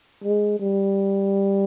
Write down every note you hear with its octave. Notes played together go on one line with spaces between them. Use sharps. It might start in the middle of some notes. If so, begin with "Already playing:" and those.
G#3
G3